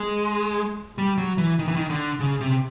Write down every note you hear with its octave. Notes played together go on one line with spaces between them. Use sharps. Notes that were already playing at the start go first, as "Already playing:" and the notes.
Already playing: G#3
G3
F#3
E3
D#3
E3
D#3
D3
C#3
C3